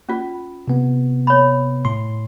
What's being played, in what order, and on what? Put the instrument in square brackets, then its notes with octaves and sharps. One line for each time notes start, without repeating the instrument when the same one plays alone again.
[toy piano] C#4 F4
[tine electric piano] C3 B3
[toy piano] C#5 B5
[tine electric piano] A2 C6